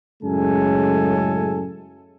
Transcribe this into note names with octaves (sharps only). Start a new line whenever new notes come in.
F#2 A2 C#3 G#3 A4 G#5